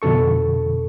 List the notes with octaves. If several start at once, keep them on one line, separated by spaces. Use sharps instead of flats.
F2 B2 D3 A4 C#6